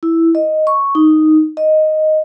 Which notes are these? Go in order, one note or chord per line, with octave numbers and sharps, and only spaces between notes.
E4
D#5
C#6
D#4
D#5